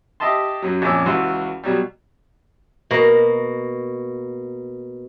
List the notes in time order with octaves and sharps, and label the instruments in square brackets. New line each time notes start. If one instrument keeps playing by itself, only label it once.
[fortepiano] G4 D#5 E5 A5 C6
F#2 F#3
A#1 F2 C#4 G#5 D6 E6
C#2 E3 F#4 C6
B2 F#3 G3
[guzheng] B2 A#3